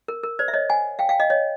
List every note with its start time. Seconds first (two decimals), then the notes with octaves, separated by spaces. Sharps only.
0.08 A#4
0.23 A#4
0.39 C5 D5
0.48 E5
0.53 C#5 D#5
0.69 F#5 G#5
0.99 F5 G5
1.09 F5 G5
1.20 D#5 F5
1.30 C#5 D#5